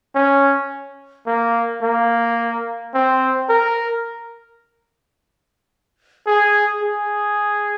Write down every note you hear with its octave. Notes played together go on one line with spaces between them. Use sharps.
C#4
A#3
A#3
C4
A#4
G#4
G#4